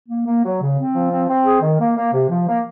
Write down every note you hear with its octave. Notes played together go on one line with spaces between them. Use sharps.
A#3
A#3
F#3
C#3
C4
F3
C4
C4
G#4
D#3
A#3
A#3
C3
F3
A#3